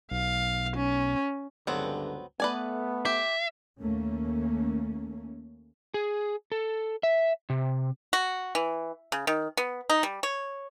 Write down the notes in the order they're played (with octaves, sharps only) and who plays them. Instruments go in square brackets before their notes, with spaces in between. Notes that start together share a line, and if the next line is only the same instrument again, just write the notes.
[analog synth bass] B1 [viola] F5
[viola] C#4
[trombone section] C#2 G2 D3 [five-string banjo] F#3 B3 C4
[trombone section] A3 B3 [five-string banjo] B4 D5 G#5
[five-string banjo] G4 [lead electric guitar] E5
[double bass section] D#2 A3 A#3 C#4
[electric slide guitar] G#4
A4
E5
C3
[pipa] F#4
E3
C#3
D#3
B3
D#4
G3
C#5